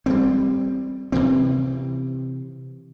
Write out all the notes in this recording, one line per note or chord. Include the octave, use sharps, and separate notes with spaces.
G3 G#3 C4
C3 E3 C4